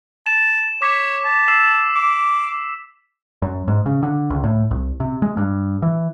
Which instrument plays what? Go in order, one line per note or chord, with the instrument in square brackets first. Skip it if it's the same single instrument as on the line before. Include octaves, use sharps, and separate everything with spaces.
[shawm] A5 [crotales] E7
[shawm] C#5 [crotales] D6 B6
[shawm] A5
[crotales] E6 C7 E7
[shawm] D6
[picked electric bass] F#2
G#2
C#3
D3
C#2
A2
C2
C3
G#3
G2
E3